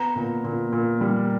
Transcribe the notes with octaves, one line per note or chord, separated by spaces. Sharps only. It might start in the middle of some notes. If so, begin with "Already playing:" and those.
Already playing: B3 A#5
A#2
A#2
A#2
G3